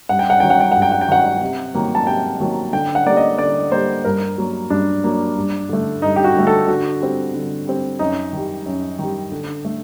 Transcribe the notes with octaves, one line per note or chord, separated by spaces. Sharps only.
G2 F#5
G5
F#5
D#3 F#3 G5
F#5
G5
G2 F#5
G5
F#5
G5
D#3 F#3 F#5
C3
D#3 F#3 A#3
A5
C3 G5
D#3 F#3 A#3
D3 G5
F#5
G3 A#3 D5
D#5
D3 D5
G3 A#3 C5
G2 A#4
F#3 A#3
G2 D4
F#3 A#3
G2
D3 A3
G2 D#4
G4
F#4
D3 A3
A4
D3 F#4
G3 C4
D3
G3 C4
F#2 D#4
D#3 G3
F#2
D#3 G3
D3
A3